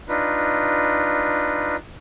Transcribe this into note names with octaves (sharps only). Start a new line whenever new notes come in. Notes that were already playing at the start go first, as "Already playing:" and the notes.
D4 D#4 F4 B4